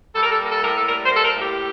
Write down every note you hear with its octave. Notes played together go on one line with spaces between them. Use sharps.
G3 A4
A#4
A4
A#3
A4
A2 A#4
A4
G3 A#4
C5
A#3
A4
A#4
A2
G4